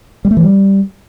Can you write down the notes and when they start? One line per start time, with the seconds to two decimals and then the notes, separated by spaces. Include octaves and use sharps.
0.25 G3
0.31 A3
0.37 E3
0.43 G3